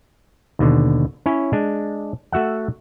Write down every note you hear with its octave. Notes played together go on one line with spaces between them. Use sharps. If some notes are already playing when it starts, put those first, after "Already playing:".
D#2 B2 D3
C#4 E4 C#5 G#5
G#3 D4
A3 F#4 E5 F#5